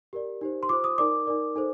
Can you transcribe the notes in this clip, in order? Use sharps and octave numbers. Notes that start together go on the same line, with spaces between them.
G4 A#4 D5
D#4 G4 C5
C6
F4 C5 D6
D#6
D#4 A#4 D5 D6
D#4 A#4 D5
D#4 A4 C5